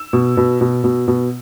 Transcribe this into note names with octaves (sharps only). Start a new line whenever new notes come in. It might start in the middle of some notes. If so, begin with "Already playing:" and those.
Already playing: E6
B2
B2
B2
B2
B2